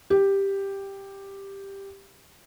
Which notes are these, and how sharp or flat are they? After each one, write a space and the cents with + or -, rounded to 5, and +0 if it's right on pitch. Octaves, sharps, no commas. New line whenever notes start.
G4 +5